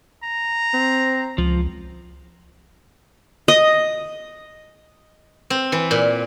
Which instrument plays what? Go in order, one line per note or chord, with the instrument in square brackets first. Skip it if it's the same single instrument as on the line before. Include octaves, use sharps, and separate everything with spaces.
[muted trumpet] A#5
[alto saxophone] C4
[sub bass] C#2 [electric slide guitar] F3
[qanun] D#5
[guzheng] C4
E3
A#2